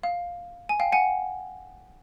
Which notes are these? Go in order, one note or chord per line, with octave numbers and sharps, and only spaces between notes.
F5
G#5
F5 G5
F#5 G#5